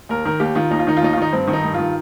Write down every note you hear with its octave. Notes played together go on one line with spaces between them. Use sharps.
D#2 A#4
D#3 A#4
D#2 G4
D#3 F4
D#2 D#4
F4
D#3 D#4
F4
D#2 D#4
F4
D#3 D#4
G2 C4
D#3
D#4
G2
D#3 F4